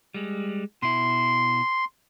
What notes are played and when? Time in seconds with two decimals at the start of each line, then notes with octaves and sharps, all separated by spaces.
0.14 G3 G#3
0.82 B2 E4 C6